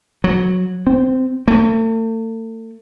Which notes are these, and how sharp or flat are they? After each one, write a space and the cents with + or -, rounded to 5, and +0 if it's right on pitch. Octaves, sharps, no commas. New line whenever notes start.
F#3 -15
C4 -15
A3 +40